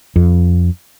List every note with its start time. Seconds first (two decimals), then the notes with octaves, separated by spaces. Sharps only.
0.16 F2